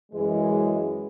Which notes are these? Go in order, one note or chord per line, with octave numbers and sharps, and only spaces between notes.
F#2 E3 G#3